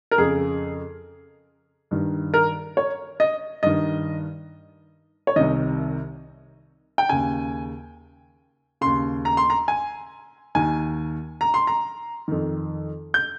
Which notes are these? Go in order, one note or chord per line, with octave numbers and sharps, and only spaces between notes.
A#4
F2 C#3 G#4
G2 D#3
A#4
C#5
D#5
G2 D#3 D#5
C#5
C2 C3 D#3 D#5
G5
D#2 C#3 G#5
D#2 C#3 C6
A#5
C6
A#5
G#5
D#2 D#3 G#5
A#5
C6
A#5
F2 D#3
G6